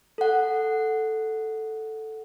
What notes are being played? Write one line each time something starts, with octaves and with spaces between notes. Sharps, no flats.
A4 F#5